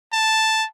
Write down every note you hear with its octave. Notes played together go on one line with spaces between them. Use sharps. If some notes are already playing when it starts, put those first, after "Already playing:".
A5